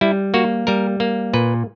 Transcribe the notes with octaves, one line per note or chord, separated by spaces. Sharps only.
G3 E4
A#3 F#4
G3 A#4
A#3
A#2 B4